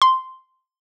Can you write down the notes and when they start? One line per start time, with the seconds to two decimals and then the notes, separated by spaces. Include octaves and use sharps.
0.02 C6